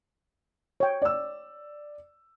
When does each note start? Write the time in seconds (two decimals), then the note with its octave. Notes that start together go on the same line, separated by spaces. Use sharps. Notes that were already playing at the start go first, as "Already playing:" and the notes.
0.80 C#5 G5
1.02 D5 E6